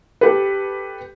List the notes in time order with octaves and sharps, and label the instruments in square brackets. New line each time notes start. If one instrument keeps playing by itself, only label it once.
[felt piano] G4 A4 B4